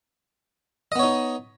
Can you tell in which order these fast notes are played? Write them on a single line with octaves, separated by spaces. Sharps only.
D#5 B3 C#5 D#4